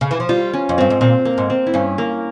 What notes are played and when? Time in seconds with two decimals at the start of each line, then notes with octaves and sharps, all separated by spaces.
0.01 C#3
0.11 E3
0.20 F3
0.29 G3 F4
0.54 C#4
0.69 F2
0.78 G2 C4
0.90 G#2
1.01 A#2 C4
1.25 A#3
1.38 G#2
1.50 C4
1.67 E4
1.74 G2 C#4
1.98 A#3